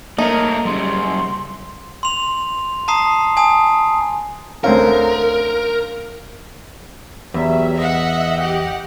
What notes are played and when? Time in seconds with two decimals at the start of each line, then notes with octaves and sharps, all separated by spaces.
0.18 A3 A#3 D#4 A#4 C#5
0.65 F#2 C#3 G3 C6
2.03 C6 F7
2.88 A5 A#5 D#6 C7
3.37 G#5 A5 D#6
4.64 D2 C4 C#4 A#4 F5
7.34 E2 F#3 G3 E5
7.77 D#5 E5 F#5
8.39 G4 F#5